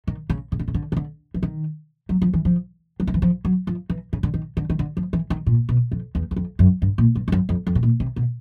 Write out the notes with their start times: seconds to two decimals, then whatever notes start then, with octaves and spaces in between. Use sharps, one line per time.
0.07 D#3
0.30 C#3
0.52 C#3
0.59 D3
0.68 C#3
0.74 D3
0.92 C#3
0.97 D3
1.34 E3
1.43 D#3
2.09 F#3
2.22 F3
2.34 E3
2.45 F3
3.00 F#3
3.07 D#3
3.14 E3
3.22 F3
3.45 F#3
3.67 F3
3.90 E3
4.13 C#3
4.23 D3
4.34 D#3
4.57 D3
4.70 D#3
4.79 D3
4.97 F3
5.13 E3
5.30 D#3
5.47 A#2
5.69 B2
5.92 F2
6.15 E2
6.31 E2
6.36 F2
6.59 F#2
6.82 G2
6.98 A#2
7.15 G2
7.28 G2
7.32 F#2
7.49 F2
7.67 F2
7.75 B2
7.83 A#2
8.00 C3
8.16 B2